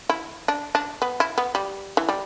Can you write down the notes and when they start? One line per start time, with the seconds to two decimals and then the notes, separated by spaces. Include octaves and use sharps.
0.09 E4
0.48 D4
0.75 D4
1.02 B3
1.20 E4
1.38 B3
1.55 G3
1.97 E3
2.09 G3